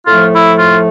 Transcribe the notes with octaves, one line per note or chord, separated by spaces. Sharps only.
A2 F3 A3 F4
E4
F4